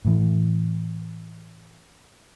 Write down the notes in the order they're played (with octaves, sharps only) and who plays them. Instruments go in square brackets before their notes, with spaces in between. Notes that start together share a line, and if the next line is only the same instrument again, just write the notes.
[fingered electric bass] A2 E3